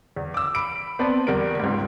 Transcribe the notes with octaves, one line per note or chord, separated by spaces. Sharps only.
E2
D6 E6
B5 D7
B3 C4 B4 D5 A5
E2 G3 A#4 D7
C#2 G#2